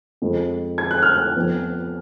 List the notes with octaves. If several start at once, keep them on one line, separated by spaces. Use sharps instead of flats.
F2 F3 G#3
G#6
F#6
F6
F#6
F2 F3 B3